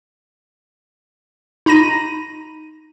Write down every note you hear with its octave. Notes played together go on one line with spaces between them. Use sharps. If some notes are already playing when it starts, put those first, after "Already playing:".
D#4 A#5 B5 A#6 D#7